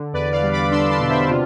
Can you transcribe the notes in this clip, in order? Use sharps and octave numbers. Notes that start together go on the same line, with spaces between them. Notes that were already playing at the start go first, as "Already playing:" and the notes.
Already playing: D3
E2 B4 D5
D5 F5
G3
B5 D6
D4 C6 E6
A5 C6
B2
C5 E5
C3 F4